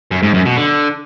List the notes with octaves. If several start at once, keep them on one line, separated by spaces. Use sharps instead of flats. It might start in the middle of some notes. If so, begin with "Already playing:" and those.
F#2
G#2
F#2
B2
D3